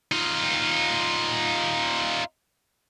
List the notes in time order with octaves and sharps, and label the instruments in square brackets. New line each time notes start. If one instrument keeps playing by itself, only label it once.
[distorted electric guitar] D#4 F4